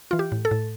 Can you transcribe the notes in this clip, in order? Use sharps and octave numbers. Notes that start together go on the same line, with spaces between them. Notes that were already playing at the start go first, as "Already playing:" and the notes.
E3 F4
G4
A2
A4
A2